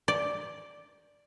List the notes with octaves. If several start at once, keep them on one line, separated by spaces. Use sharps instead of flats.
D5